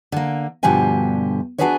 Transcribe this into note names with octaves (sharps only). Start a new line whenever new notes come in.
D3 A#3
G2 B2 D3 F3 G4 G#5
B3 D4 F#4 G#4 B4 C#5